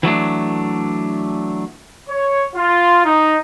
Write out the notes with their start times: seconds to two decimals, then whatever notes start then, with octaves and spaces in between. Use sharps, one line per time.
0.03 E3 F#3 A3 D4
2.09 C#5
2.55 F4
3.05 D#4